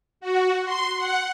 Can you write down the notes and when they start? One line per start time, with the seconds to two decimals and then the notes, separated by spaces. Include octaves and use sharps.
0.20 F#4
0.65 C6
0.97 F#5